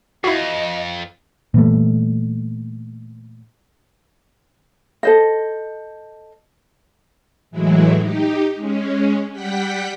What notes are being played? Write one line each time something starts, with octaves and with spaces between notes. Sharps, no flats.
F2 E4 F#4 D#5
A#2 E3 G3 A3
A4 C5 D#5
A2 E3 F#3 G#3 E4
D#4 G4
G#3 C#4
G3 F#5 G5 B6